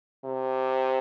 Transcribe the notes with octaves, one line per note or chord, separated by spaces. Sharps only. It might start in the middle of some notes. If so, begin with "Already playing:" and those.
C3